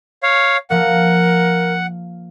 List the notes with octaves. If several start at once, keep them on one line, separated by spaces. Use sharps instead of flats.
C#5 F5
F3 A#3 A#4 F#5